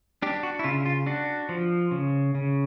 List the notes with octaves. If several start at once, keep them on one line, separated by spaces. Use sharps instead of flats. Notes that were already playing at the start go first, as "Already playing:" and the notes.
D4 G4
F#4
E4
C#3 F4
F4
D4 F#4
F3
C#3
C#3